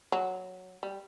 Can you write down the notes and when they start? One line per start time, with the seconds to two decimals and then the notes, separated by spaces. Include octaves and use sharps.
0.12 F#3
0.83 G3